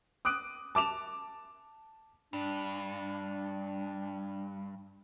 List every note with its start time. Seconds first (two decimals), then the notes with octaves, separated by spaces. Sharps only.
0.25 D6 D#6 F#6 D7
0.75 A5 D6 E7 F7
2.33 G2 D4